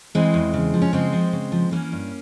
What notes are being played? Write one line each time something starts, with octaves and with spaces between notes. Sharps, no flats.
E3 G#3 C4
E2
C#3
F3
C#4
C#3 G#3 C4
F3
C#3
F3
E3 A#3 C#4
G2